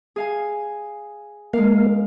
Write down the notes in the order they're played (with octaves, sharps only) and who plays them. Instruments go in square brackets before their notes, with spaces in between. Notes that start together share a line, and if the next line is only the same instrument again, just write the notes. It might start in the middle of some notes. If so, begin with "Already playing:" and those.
[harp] G#4 F5 G#5
[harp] G#3 D4 F5 [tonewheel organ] A#3 A#4